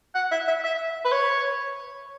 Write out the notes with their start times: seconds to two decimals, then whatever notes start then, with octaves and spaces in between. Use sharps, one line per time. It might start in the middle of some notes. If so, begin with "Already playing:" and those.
0.15 F#5
0.32 E5
0.48 E5
0.64 E5
1.05 B4
1.12 C#5